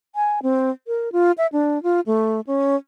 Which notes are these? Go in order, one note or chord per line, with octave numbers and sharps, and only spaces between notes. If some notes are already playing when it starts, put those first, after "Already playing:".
G#5
C4
A#4
F4
E5
D4
F4
A3
C#4